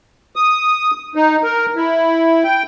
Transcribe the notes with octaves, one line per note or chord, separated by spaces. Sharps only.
D#6
D#4
A#4
E4
G5